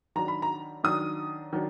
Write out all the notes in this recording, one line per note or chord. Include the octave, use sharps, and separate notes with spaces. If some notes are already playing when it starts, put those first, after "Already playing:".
D#3 F#3 D4 A#5
B5
A#5
D#3 F#3 D4 D#6
D#3 F#3 D4